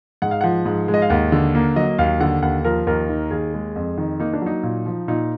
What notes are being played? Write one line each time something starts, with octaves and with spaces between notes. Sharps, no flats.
G#2 F#5
F5
F3 F#5
G#2
G#3
D#5
F5
D#2 F#5
D3
A#3
F#3 D#5
D#2 F5
D3 F#5
D#2 F#5
F3 A#4
D#2 A#4
D#3
D#2 G#4
G#3
F2
D#3
A#3 D#4
D4
F#3 D#4
A#2
F3
A#2 D#4